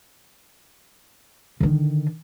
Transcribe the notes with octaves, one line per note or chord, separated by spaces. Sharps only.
D3 D#3